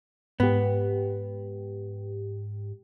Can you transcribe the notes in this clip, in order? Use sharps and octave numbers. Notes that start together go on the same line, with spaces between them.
G#2 B3 G4